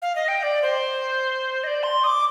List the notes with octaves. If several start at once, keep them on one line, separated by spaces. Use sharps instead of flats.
F5
D#5
G5
D5
C5
D#5
D5
C6
D#6
D6